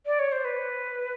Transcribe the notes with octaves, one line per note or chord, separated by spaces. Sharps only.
D5
C#5
C5
B4